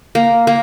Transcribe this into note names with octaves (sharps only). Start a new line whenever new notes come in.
A#3
A#3